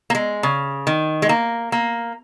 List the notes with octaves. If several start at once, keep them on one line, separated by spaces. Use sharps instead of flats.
A#3
G#3
C#3
D#3
G#3
A#3
A#3